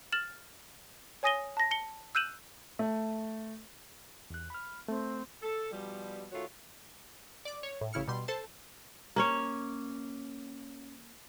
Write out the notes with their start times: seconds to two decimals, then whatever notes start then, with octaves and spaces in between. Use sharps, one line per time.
0.12 F6 A6 E7 F#7
1.23 C#5 G#5 D#6 A#6 D#7 G7
1.57 A5 A#6
1.71 A5 C#7 G7
2.15 E6 F#6 G6 D#7 E7 F#7
2.79 A3
4.30 E2 F#6
4.50 B5 F6
4.88 A3 C4
5.42 A4
5.72 B2 F3 G3
6.32 D#3 A3 F4 F#4 C#5
7.45 D5 D6
7.63 C#5
7.81 A2
7.93 A1 C#3 E4 F6 C#7
8.08 B2 G3 C6
8.28 A4 C5 A5
9.16 A#3 C#4 C#5